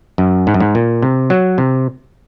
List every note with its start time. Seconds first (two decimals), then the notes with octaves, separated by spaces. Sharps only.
0.18 F#2
0.47 G#2
0.54 F#2
0.60 G#2
0.75 A#2
1.03 C3
1.30 F#3
1.58 C3